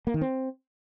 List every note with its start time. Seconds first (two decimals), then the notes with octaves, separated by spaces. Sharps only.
0.07 A#3
0.14 D#3
0.21 C4